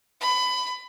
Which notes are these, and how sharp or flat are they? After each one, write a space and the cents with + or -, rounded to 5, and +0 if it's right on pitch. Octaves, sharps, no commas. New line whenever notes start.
B5 +20